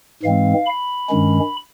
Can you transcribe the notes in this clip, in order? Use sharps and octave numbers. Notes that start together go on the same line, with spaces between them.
G#2 E3 G#3 C4 F5
B5
G2 D#3 G#3 C#4